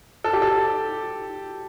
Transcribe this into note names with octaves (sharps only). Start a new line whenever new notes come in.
A4
G4
A4